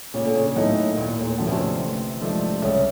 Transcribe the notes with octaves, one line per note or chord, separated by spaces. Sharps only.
A#2 C#3
D3
C#3
A2 F#3 B3 D#4
D#2 A#2
A2
A#2
D3 F3 A3 C#4
B2
C3
A1
G#2 F3 A3 D4
C2 C#3